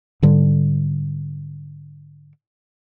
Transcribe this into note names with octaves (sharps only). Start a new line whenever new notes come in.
G#2 D3 G3